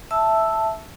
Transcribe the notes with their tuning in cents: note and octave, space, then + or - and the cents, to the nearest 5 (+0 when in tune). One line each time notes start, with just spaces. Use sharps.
E5 +0 A5 +0 E6 +0